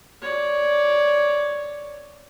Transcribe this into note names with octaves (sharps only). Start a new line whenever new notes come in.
C#5 D5